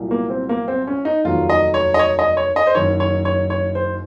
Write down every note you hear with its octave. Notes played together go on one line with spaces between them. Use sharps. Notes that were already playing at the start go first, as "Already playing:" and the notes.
Already playing: C2 A#2 F#3
A#3
C4
A#3
C4
C#4
D#4
F1 D#2 D#3 F#3 F4
D#5
C#5
D#5
C#5
D#5
C#5
D#5
C5
F#1 F#2 D#3 C#5
C#5
C#5
C#5
C5